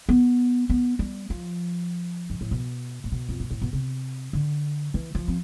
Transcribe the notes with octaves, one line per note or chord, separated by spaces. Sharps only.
B3
B3
G3
F3
G2
A2
B2
A2
B2
F2
G2
A2
B2
C3
D3
E3
F3
C4